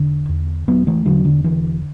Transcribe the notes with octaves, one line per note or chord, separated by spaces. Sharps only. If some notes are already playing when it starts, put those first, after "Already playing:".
Already playing: E1 D3
E2
E1 F#3 B3
E3 A3
E1 D3 F#3
D3
D3 E3